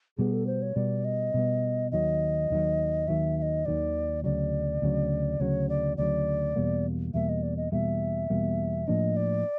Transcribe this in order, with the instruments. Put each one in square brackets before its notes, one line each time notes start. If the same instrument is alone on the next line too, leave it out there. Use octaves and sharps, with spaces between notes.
[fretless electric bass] B2 G3 B3 [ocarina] G#4
[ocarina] A4
C5
C#5
[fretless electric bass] B2 G3 B3 [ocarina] D5
[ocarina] D#5
[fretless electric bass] B2 G3 B3
[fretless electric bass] D#2 D#3 F#3 [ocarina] D#5
[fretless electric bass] D#2 D#3 F#3
[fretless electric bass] D#2 D#3 F#3 [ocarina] E5
[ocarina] E5
D#5
[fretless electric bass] D#2 D#3 F#3 [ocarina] D5
[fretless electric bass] D2 C#3 F#3 [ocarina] D5
[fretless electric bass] D2 C#3 F#3
[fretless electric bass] D2 C#3 F#3 [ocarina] C#5
[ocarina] D5
[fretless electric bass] D2 C#3 F#3 [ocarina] D5
[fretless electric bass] E2 B2 G3 A#3
[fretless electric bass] E2 B2 G3 A#3 [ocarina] E5
[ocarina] D#5
D5
D#5
[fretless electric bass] E2 B2 G3 A#3 [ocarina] E5
[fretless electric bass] E2 B2 G3 A#3
[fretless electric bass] A2 F3 A#3 D4 [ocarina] D#5
[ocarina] D5